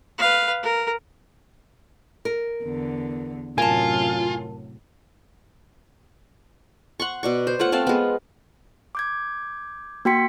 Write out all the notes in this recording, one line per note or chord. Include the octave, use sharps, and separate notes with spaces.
B4 F5
A#4
A#4
E2 D3
F#2 A2 C3 F4 A#4 G#5 A5
F#5 C6 C#6
B2 D5 C#6
C5
A3 F4 C#5 F#5
A3 C4 F5 A5
G#3 B3
D6 G6 G#6
A#3 F#4 G5 C6 B6 C#7